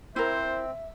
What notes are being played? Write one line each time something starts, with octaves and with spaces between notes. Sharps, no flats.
C4 E4 A#4 C5 E5